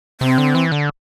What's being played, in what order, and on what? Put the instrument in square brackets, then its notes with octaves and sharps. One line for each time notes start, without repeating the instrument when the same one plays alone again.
[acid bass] C3 [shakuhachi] C4
[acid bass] D3
E3
D3